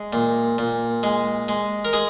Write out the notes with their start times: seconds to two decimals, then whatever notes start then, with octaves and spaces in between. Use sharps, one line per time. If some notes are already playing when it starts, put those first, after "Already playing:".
Already playing: G#3
0.13 A#2
0.58 A#2
1.03 G#3
1.48 G#3
1.85 A#4
1.93 G#3 G#4